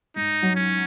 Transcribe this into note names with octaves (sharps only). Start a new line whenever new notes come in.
G#2 D#4
F#3
C#4